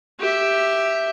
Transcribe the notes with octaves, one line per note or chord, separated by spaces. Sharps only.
G4 E5